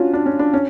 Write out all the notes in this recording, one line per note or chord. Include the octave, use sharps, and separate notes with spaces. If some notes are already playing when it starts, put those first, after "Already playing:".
Already playing: C#4 D4 F4 F#4
D4
C#4
D4
C#4